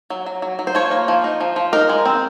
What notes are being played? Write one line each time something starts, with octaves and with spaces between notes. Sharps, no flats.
F#3
F#3
F#3
F#3
C5
F3 C#5
A#3
F3
D#4
F3
F3
D#4 A#4
G#3
C4